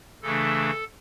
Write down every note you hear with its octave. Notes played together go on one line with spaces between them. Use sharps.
C#3 E3 A3 D4 A4